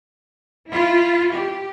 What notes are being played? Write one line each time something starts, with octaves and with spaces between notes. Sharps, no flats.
E4 F4
G4